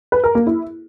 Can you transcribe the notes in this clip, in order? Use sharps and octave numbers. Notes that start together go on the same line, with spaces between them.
B4
A#4
A#3
E4